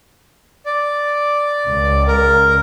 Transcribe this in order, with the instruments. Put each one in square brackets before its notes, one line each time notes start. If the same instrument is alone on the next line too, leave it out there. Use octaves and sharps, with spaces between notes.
[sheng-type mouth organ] D5
[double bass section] C#2
[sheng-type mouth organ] A#4